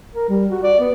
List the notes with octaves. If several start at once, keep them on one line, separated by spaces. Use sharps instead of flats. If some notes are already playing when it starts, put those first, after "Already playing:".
A#4
G3
F#4
D5
B3